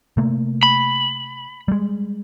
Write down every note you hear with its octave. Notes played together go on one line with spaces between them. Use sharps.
C3 A3 A#3
B5
G3 G#3